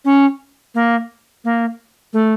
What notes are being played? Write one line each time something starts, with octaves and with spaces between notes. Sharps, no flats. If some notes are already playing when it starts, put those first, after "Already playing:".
C#4
A#3
A#3
A3